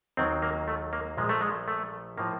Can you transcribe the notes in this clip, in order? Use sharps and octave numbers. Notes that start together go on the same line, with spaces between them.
D#2 D#3 F#3 C4
A#3
A3
A#3
A#1 A#2 F3 G#3
A3
G#3
A3
A2 F3 A#3